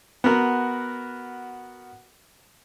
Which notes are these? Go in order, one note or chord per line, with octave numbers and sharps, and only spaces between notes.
B3 F#4 A#4